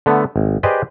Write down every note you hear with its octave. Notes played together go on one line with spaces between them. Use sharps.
D3 A3 B3
G#1
G4 G#4 B4 C5 D5 D#5